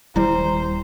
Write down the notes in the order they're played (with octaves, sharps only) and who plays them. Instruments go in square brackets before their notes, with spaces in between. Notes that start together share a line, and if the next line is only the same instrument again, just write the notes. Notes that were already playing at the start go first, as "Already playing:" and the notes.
[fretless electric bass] D#1 G3 [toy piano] E4 [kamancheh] C5 A#5